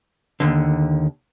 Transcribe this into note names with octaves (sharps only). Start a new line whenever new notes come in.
D#2 D3